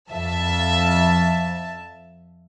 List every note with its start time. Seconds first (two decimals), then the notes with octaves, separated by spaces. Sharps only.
0.11 F2 E5 A5